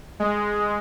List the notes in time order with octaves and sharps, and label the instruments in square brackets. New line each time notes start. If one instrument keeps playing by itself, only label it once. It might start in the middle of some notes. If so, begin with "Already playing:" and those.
[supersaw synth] G#3